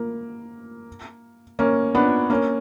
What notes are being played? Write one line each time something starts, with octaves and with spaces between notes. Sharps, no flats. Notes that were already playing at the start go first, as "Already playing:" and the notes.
Already playing: A#3
A#3 C#4
B3 D4
A#3 C#4